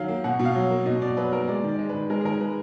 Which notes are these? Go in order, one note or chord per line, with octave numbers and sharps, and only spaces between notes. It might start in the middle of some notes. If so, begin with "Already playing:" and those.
Already playing: D#3 F#3 F5
A#3
B2 F#5
B2
F5
F#3
A#3
B2 D#5
B2 D5
F#3 B4
A#3 A#4
G#3 D5
D#3
D5
G#3
D#3 B4
G#3 A#4
G#4
D#3 A#4
G#3 B4